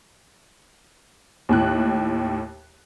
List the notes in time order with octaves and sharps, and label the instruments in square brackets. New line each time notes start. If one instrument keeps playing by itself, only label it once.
[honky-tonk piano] D#2 A2 F#6